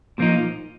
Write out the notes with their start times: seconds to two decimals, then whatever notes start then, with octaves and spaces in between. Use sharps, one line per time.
0.18 A#2 F3 A#3 D#4